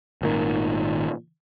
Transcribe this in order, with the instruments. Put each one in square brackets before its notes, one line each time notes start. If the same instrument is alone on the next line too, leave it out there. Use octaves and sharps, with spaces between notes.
[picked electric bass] G#1 A#2 D#3